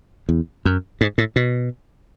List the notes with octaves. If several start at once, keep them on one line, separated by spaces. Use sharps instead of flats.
E2
F#2
G#2
A2
B2